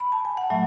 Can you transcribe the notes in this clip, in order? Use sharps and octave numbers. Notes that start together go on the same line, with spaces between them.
B5
A5
G#5
F#5
A2 F#3 A3 E5